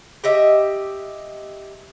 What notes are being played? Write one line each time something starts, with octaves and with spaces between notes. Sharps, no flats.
G4 D#5 E5